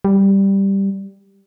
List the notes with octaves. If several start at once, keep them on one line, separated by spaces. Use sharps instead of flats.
G3